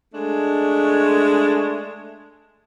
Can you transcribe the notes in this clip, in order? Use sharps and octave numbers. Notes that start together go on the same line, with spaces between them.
G#3 A3 D4